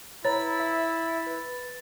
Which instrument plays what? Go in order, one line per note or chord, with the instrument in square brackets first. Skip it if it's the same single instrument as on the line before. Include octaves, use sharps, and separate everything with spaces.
[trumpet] E4 [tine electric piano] B4 A#5 [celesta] C#5 [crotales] A6
[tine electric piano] E5
B4